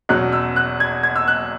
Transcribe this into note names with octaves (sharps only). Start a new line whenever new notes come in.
E2 B2 F#3 C#4 F#6
E6
F#6
G#6
G#6
E6
F#6